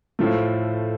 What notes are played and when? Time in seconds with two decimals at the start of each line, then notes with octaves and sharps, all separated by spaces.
0.19 A2 F3 A3